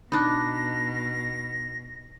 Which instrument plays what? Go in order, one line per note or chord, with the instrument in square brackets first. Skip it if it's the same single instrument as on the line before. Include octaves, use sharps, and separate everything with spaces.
[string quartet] B2 [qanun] D4 D#4 [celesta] B5 F#6 [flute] A#6